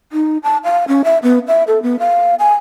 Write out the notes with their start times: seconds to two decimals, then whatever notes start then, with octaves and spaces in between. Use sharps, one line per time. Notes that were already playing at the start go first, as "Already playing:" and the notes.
0.12 D#4
0.43 A5
0.64 F5
0.88 C#4
1.04 E5
1.23 B3
1.47 E5
1.67 A4
1.82 B3
1.99 F5
2.39 G#5